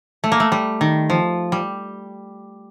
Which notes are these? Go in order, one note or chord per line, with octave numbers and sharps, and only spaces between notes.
A3
A#3
A3
G3
D#3
F3
G3